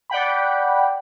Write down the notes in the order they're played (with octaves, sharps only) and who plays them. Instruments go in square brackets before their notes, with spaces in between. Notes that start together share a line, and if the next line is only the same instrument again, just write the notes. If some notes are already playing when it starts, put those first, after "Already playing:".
[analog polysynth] D5 F#5 G5 B5